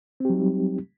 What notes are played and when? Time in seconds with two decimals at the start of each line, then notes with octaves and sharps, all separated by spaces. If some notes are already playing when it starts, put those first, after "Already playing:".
0.20 C4
0.25 G4
0.29 F#3
0.34 D#4
0.39 G3